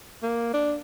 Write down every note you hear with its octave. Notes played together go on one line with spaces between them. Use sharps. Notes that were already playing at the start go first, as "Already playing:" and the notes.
A#3
D4